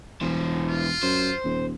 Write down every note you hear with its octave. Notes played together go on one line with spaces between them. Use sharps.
E1 E3 C5
F4
F#2 C5
D#1